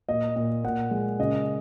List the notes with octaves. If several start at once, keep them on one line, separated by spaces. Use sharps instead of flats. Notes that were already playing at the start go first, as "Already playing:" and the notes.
A#2 D#5
A#2
A#2 F#5
G#3
C#3 D#5